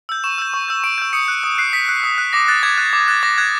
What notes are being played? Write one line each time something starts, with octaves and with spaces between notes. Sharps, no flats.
E6 G6
C#6 E7
E6 G6
C#6
E6 G6
C#6 D7
E6 G6
D#6 C#7
F#6
D#6
F#6 C7
D#6 B6
F#6
D#6
F#6
D6 A#6
F#6 A6
D6 G#6
F#6
D6
F#6 A6
D6 A#6
F#6 G#6